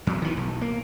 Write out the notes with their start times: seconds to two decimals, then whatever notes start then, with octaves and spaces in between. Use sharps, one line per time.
0.07 E2 F#3
0.22 D#3 E3
0.37 B1
0.61 A#3